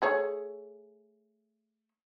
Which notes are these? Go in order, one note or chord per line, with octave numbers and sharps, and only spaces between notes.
A3 G#4 C#5